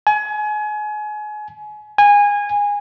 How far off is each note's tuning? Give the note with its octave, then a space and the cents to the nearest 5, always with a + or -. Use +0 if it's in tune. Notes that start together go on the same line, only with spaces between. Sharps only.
G#5 +30
G#5 -20